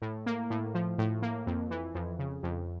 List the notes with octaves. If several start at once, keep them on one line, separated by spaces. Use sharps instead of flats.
A2
A#3
A2
F3
A2
A#3
F2
E3
F2
C#3
F2